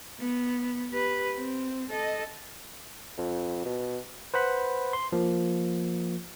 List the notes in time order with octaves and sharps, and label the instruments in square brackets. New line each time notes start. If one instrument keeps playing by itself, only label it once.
[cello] B3
G4 B4
C4
A4 D#5
[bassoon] F2
B2
[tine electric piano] B4 C5 F#5 B5
C6
F3 A#3